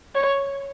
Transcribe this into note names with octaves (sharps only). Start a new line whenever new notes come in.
C#5